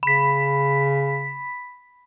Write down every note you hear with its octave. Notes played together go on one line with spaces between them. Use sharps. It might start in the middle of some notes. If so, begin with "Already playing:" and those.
C#3 B5 B6